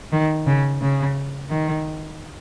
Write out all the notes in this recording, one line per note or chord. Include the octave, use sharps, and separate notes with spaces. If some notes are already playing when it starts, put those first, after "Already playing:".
D#3
C#3
C#3
D#3